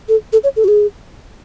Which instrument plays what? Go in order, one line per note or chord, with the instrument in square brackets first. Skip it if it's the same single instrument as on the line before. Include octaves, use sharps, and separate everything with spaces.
[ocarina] A4
A4
C#5
A4
F#4
G#4